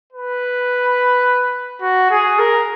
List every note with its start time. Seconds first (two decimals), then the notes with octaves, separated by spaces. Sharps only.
0.13 B4
1.82 F#4
2.10 G#4
2.39 A#4